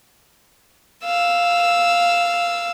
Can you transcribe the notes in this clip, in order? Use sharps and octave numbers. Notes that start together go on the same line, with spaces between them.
F5 E6